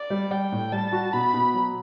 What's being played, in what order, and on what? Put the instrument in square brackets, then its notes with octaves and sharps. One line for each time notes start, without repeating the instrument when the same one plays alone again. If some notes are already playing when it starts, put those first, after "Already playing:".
Already playing: [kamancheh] D5
[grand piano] G3
[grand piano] G3 [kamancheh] G5
[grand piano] A2
[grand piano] G3 [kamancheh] A5
[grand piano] F#4
[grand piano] B2 [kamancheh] B5
[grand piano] B2
F#3